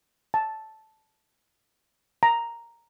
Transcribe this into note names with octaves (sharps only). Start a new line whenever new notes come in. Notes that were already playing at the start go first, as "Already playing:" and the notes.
A5
A#5